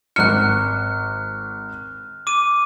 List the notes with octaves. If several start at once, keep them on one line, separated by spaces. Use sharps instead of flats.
G#1 F6 F#6 C#7
D6 D#7